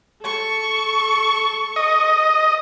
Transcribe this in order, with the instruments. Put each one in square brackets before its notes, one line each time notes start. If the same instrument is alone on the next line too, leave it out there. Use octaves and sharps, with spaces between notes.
[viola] A4 C#6
[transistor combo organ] D#5